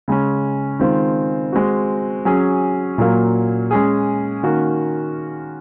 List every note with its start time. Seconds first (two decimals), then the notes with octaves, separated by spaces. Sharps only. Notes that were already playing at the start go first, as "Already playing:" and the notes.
0.08 C#3 G#3 C#4
0.79 D#3 G#3 C4 F4
1.53 G#3 C4 F#4
2.25 F#3 C#4 G#4
2.98 A#2 F#3 A#3
3.71 G#3 C#4 G#4
4.43 D#3 A#3 C#4 F#4